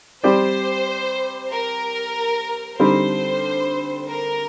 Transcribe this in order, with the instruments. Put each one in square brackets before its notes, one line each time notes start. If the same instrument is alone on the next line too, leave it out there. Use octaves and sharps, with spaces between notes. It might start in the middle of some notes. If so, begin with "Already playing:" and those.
[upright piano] G3 C4 G4 D5 [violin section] C5
[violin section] A#4
[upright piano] D3 G3 C4 D#4 [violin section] C5
[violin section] A#4